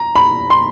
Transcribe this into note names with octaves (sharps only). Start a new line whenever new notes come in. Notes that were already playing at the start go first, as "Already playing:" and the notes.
Already playing: A#5
B5
C6